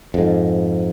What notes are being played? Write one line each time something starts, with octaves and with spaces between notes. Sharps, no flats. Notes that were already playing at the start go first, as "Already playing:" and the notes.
F2 G#2